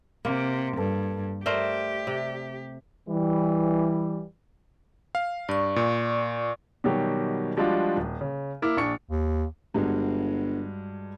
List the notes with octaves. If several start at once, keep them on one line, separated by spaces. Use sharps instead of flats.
C3 A#3
G2 A4 B4 A5
A3 G4 A#4 C5 D5 E5
C3
E3 G3
F5
G2 D5 C#6
A#2
B2 D#3 F#3 G3 G4
F3 G3 G#3 D4 F4 F#4
D#1
C#3
A#3 E4 D6 F6
A#1 D4 C#6 C#7
D#2
G1 G2 F#3 G#3